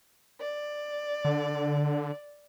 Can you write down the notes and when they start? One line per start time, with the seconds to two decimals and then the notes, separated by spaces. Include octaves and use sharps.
0.39 D5
1.25 D3